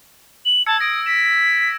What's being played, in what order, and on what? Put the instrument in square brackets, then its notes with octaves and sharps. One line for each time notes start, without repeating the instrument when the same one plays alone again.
[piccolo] F#7
[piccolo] A5 [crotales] E6 G#6 C#7
[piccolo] D#6 [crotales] A#6 D7
[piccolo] B6 [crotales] E7